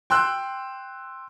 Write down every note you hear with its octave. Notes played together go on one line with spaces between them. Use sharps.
G5 C6 E6 F#6